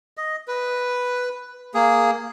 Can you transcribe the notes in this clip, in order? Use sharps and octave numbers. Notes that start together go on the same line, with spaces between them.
D#5
B4
A#3 G#4